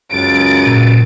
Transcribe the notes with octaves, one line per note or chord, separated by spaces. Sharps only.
C#2 F#2 A6 D7
A#2